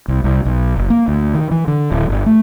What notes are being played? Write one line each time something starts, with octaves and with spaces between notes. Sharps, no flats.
C2
C2
B1
F#1
A#3
D2
D#3
E3
D3
D1
G1
A3